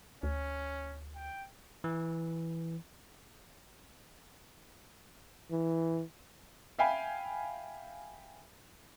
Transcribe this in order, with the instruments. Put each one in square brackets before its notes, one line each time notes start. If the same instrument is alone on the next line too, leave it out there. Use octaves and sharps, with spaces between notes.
[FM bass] D2 [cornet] C#4
[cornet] G5
[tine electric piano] E3
[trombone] E3
[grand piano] E5 F5 G5 G#5 B5